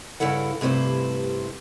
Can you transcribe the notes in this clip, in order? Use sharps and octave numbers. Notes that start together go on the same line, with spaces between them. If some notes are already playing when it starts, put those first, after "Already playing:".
G2 C#3 E4 A4 F#5
G2 C3 A3 E4 C5